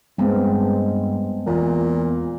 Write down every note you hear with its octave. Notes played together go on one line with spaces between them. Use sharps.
G2 G#3 B3 C4
E2 A#2